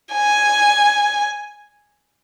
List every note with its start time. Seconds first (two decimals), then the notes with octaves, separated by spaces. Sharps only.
0.13 G#5